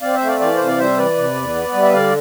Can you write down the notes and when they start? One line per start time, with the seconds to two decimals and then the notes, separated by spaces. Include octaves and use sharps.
0.02 C4 D5 F5
0.15 C5 E5
0.21 A3
0.27 D5 F5
0.40 E3 D5 F5
0.56 C3 C5
0.67 D5
0.78 G3 C5 E5
0.97 E3 B4 D5
1.16 C3
1.35 E2
1.55 B3
1.73 G3
1.82 E5
1.93 D3 D5 F5